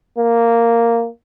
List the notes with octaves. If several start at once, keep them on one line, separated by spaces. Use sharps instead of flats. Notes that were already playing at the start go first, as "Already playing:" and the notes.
A#3